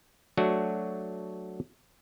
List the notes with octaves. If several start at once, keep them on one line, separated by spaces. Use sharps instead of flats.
F#3 A3 D4 F#4